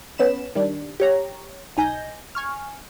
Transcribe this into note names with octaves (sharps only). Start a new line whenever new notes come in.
B3 C#4 B5 E7
D#3 G3 D4
G4 C#5 A#5
B1 D#4 G#5 G6 A#6
G#5 C#6 F6